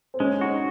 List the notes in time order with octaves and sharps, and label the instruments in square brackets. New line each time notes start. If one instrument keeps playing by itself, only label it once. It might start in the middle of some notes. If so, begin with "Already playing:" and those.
[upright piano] C4
[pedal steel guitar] G#3 [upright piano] C#4
[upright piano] D#4 [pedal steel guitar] F#4